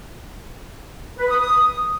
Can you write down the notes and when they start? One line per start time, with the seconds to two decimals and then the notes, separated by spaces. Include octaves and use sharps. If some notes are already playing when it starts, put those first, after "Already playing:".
1.17 B4
1.28 D#6
1.39 D#6